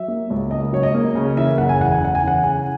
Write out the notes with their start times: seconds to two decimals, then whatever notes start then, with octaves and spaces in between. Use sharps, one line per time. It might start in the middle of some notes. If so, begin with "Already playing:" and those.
Already playing: F#3 E5
0.08 A#3
0.30 C#2
0.51 C#3 D#5
0.73 F#3 C#5
0.83 D#5
0.94 A#3
1.15 C#3 C#5
1.37 E3 E5
1.58 F#1 F#5
1.69 G#5
1.79 E2 F#5
1.92 G#5
2.01 C#3 F#5
2.15 G#5
2.23 E3 F#5
2.43 C#3 G#5